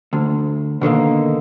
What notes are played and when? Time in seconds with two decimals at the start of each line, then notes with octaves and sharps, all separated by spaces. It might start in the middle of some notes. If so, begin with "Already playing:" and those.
0.13 D2
0.81 B2 D3 D#3 A#3